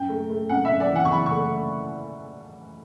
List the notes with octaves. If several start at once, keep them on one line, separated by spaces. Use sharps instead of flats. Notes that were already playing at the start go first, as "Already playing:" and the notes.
Already playing: F#2 G5
A3
A3
F#2 F#5
E5
F#2
D5
E3 F#5
C#6
E3 B5
C#6
A3